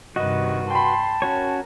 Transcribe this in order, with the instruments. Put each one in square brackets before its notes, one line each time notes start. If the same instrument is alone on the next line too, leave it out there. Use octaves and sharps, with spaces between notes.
[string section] G2 C3 D#3 [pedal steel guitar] F#4 B4 [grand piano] D#5
[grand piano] G5 B5 [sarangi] A5 [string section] C6
[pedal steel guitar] C#4 F#4 C#5 [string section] A#4